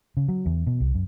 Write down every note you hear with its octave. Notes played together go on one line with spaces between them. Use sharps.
C#3
F#3
E2
B2
C2
F#2